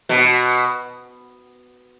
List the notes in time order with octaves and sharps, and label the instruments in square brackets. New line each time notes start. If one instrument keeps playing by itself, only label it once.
[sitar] B2